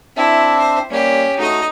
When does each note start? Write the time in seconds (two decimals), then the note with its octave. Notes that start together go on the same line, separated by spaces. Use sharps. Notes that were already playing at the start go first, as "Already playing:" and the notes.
0.17 C4 D4 E4 E5
0.59 C5
0.91 G3 A#3 C#4 G4
1.39 A3 D#4 F#4 D#5